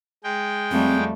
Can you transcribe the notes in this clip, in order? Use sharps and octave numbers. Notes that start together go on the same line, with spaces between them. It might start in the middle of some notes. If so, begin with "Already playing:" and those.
G#3 G5
F2 G3 A3 C4